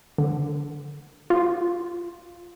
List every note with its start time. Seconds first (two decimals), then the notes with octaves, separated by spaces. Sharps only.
0.18 D3
1.30 F4